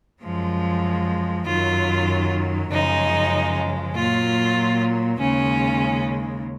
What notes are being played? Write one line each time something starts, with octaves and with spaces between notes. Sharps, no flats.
F#2 F3 G#3
F#2 D#3 F#3 F4
F#2 C#3 F3 G#3 D#4
A#2 F#3 F4
D#2 C#3 G#3 C#4